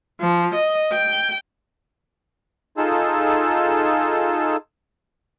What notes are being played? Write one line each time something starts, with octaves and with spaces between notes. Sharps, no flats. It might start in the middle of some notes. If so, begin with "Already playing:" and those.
F3
D#5
G5
D#4 F4 G#4 A4 E6